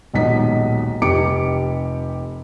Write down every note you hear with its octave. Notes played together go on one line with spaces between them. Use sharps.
D#1 B1 G#2 D#5 B6
F1 G4 D6 C#7 D7